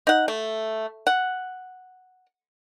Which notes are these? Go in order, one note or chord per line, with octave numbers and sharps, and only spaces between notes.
D#4 F#5
A3
F#5